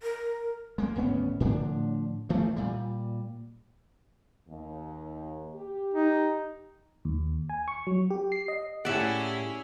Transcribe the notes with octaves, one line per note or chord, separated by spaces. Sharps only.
A#4
G#3 A#3
D1 G#1 B3 C#4
A2 D3 F3 D4
G2 E3 A3
A#2 G3
D#2
G4
D#4
D#2
G#5
C#6
F#3
G4
C7
D#5
A2 C#4 E4 G4 G#4 D5 E5 F#5